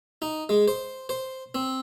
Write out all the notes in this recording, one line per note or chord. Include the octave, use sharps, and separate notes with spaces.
D#4
G#3
C5
C5
C4